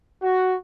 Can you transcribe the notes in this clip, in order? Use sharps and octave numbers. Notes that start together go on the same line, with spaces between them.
F#4